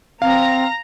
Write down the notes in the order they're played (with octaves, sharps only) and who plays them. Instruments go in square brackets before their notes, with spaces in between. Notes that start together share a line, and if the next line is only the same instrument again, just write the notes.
[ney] C4 [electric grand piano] F5 [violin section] A#5 A#6